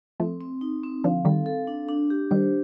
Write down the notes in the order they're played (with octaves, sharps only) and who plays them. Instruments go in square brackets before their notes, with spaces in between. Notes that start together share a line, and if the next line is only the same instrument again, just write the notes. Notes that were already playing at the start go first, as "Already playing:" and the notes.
[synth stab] F3 A3 [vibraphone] C4
[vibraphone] C4
D#4
C4
[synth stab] D3 F3 [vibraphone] F5
[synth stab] D#3 G3 [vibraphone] A4
[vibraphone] A4
D4
D4
G4
[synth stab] D#3 G3 [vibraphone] C5